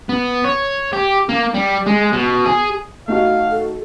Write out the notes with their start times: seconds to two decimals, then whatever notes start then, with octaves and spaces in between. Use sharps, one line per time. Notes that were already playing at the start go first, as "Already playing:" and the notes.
0.09 B3
0.45 C#5
0.93 G4
1.29 A#3
1.54 G3
1.86 G#3
2.13 B2
2.45 G#4
3.08 A3 D#4 F#4 F5
3.51 A4